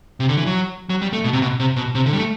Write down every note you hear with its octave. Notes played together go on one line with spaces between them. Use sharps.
C3
D3
E3
F#3
F#3
G3
A3
B2
C3
B2
C3
B2
C3
D3
G3
A3